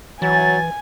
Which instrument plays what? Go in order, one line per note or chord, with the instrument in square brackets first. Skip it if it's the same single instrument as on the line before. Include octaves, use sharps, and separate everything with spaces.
[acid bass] E3 [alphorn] F#3 [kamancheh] G#5 [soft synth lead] A6